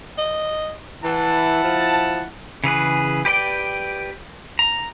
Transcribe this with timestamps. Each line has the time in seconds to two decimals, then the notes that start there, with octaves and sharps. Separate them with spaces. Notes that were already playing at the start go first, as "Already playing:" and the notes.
0.18 D#5
1.04 E3 E4 F#5 A5
1.64 F3
2.64 C#3 E3 G#4 B4
3.25 G4 B4 D5 G5
4.59 A#5